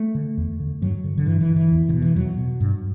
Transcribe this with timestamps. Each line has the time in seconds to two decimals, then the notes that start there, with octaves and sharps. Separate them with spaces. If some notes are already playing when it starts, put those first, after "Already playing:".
Already playing: A3
0.15 D3
0.37 E2
0.60 D3
0.82 G2 F#3
1.04 D3
1.18 D3
1.26 G2 E3
1.41 E3
1.48 D3
1.56 E3
1.71 E2
1.89 D3
1.93 B2
2.02 E3
2.16 E2 F#3
2.38 B2
2.60 G2